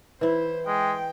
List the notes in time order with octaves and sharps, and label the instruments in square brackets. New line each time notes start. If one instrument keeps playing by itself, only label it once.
[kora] E3 E4 [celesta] B4 [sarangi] C5
[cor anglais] G#3 [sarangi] G5